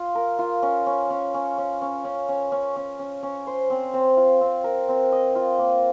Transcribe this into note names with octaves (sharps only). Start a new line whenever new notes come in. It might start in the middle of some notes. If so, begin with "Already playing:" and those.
Already playing: F4
A#4
F4
C#4
C#4
C#4
C#4
C#4
C#4
C#4
C#4
C#4
C#4
C#4
C#4
C5
C4
C4
F4
C4
A#4
C4
D#5
F4
A#3